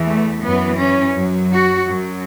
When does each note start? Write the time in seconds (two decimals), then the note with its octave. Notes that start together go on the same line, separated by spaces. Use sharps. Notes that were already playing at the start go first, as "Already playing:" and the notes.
Already playing: E2 E3
0.08 A3
0.44 F#2 E3 B3
0.80 C#4
1.16 F#2 F#3
1.53 F#4
1.89 F#2 F#3